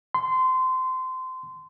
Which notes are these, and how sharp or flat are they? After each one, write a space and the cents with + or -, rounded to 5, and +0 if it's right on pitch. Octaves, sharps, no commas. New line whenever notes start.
C6 -20